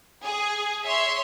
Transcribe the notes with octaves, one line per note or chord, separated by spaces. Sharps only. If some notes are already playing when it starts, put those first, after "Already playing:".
G#4
C#5 E5 C6